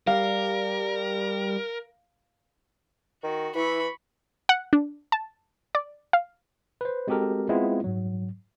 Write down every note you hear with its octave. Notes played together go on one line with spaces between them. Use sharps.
G3 A#4 F5
D#3 F#4
E3 E4 B5 C#6
F#5
D4
A5
D5
F5
B4 C5
G#3 C4 F#4 G4 A4 A#4
G#3 B3 C4 E4 F4
G#2 F#3